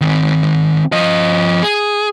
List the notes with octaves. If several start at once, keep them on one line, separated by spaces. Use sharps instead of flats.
D#3 C4
F3 D#5
G#4